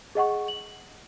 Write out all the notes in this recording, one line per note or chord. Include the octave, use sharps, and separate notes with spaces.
G#4 D#5 F#5 C#6
F#7